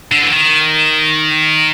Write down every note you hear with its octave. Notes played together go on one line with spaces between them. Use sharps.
D3
E3
D#3